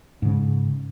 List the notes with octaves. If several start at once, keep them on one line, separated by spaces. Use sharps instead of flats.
G#2 C#3